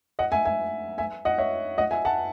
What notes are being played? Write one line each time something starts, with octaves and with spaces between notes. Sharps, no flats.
D#5 F#5
E5 G#5
E5 G#5
E5 G#5
D#5 F#5
C#5 E5
D#5 F#5
E5 G#5
F#5 A5